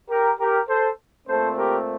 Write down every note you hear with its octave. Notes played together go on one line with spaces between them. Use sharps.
G4 A#4
G4 A#4
A4 C5
A#2 A3 C4 A4 C5
G4 A#4